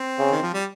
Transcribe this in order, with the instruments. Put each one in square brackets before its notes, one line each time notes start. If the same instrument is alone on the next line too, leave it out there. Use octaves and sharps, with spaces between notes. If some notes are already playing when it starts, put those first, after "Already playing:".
Already playing: [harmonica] C4
[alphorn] C#3
[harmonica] D#3
F3
G3